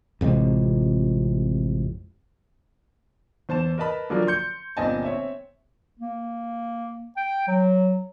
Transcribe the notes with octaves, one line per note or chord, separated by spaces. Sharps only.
A1 F2 C3 G#3
E2 C5 A5 E7
A#4 B4 D#5 A5 B5
D3 F3 F#3 A#3 A#4 D5
C6 G6 C#7
G1 A#2 C4 D#5 G#5 A5
C4 C#5 E5
A#3
G5
F#3